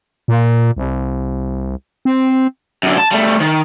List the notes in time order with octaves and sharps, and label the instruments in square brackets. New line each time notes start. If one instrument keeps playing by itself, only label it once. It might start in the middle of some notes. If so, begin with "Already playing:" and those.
[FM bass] A#2
C2
C4
[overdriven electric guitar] F#2 D3
A5
G3 A3
D#3